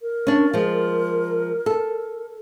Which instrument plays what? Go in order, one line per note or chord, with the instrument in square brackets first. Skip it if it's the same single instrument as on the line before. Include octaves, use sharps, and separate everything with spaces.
[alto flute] A#4
[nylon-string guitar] C#4 D4
F3 G#3
A4